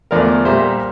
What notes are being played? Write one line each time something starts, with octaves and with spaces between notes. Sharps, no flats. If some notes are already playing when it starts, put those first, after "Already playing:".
E2 D3 F3 A3 A#4 D5
A#2 G3 A#3 C5 E5